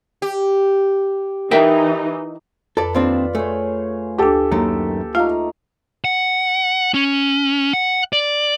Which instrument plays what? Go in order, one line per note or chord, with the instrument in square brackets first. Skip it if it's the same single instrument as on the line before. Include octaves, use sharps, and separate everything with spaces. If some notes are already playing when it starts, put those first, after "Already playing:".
[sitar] G4
[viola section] E3 D#4 [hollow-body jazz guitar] A#4 E5 G5
[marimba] F2 [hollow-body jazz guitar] A4 D5 [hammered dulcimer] B4
[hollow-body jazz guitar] D#2 C4 D4 [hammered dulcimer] F4 D5 [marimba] A4
[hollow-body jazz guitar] A3 [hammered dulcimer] G#4 C5 C#5
[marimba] D2 D4 [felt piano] G4 A4
[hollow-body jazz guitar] F#2 D#3 A3 [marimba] A#3
[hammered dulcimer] A3 D#4 [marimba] F4 [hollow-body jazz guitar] F5
[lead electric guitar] F#5
C#4
F#5
D5